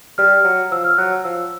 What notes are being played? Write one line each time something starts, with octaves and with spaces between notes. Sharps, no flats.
G3 F6
F#3
F3 E6
F6
F#3 F#6
E6
F3 E6